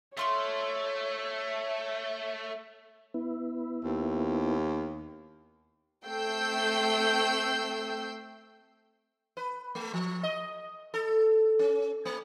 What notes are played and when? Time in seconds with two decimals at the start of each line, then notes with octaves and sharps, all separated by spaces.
0.17 A3 F4 C#5 C6 C#6
3.14 B3 E4
3.84 D#2
6.06 A3 C4 G5 E6 G6 C7
9.37 B4
9.75 A3
9.93 F3
10.23 D#5
10.94 A4
11.59 C#4
12.05 A#3